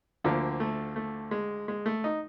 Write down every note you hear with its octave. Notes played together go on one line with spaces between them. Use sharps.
D2 D3 F3 A#3
A3
A3
G#3
G#3
A3
D#4